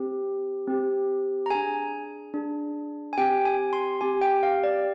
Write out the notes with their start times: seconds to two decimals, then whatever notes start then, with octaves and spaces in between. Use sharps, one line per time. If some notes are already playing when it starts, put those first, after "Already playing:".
Already playing: C4 G4
0.68 C4 G4
1.46 A#5
1.50 D4 G#4 G#5
2.34 D4 G#4
3.13 G#5
3.18 C4 G4 G5
3.45 G#5
3.73 C6
4.01 C4 G4 G#5
4.22 G5
4.43 F5
4.63 D5